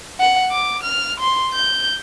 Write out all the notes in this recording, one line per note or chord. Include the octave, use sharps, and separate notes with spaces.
F#5
D6
F6
C6
G6